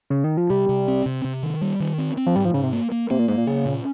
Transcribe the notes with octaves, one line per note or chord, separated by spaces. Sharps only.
C#3
D#3
F3
C3 G3
C3
C4
C3
C3
D#3
G3
D#3
C4
C4
F3
G#2 G3
F3
G#2 C#3
C3
A#3
A#3
C3 A#3
A#2
G#2 A#3
A#2
C#3 C#4
A#2